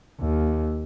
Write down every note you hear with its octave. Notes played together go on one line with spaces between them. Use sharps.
D#2